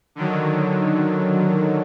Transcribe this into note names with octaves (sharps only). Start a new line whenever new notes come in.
D3 D#3 F#3